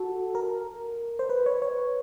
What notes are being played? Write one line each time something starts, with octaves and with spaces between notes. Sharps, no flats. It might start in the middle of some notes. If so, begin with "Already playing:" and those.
Already playing: F#4 A4
A#4
C5
B4
C#5
C#5